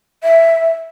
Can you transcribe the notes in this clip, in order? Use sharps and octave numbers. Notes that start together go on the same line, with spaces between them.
E5